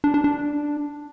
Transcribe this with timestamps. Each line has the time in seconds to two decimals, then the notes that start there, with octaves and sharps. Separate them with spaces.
0.04 D4
0.14 D4
0.24 D4